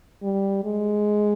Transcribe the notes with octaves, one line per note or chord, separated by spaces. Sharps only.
G3
G#3